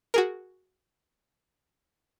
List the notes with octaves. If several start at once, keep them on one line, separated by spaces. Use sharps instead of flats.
F#4 G#4 A#4